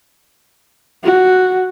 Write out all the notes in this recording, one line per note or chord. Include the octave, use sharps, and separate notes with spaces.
F#4